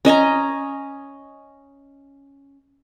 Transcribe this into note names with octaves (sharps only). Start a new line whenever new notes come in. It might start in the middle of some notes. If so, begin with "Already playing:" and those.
C#4 D#5 G#5 A#5